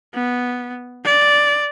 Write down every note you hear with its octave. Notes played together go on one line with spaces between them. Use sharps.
B3
D5